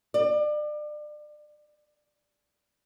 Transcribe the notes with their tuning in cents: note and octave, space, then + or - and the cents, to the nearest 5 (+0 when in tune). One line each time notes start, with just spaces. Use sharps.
D5 +30